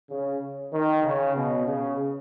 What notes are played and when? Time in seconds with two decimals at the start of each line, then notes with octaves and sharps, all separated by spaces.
0.09 C#3
0.72 D#3
1.03 C#3
1.35 B2
1.66 C#3